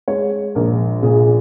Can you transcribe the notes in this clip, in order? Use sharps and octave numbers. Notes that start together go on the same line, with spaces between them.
G#3 C#5
A#1 A#4
A#2 G#4